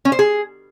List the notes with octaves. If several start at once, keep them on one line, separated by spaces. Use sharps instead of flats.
C#4
C5
G#4